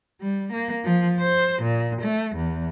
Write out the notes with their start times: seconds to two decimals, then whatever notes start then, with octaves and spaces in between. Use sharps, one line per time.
0.21 G3
0.52 A#3
0.85 F3
1.20 C5
1.62 A#2
2.02 A3
2.35 E2